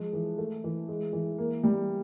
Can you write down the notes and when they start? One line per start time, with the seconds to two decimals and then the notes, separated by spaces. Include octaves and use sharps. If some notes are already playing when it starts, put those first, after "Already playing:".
Already playing: F3 G#3
0.13 E3
0.38 A3
0.64 E3
0.88 G#3
1.13 E3
1.38 A#3
1.63 G3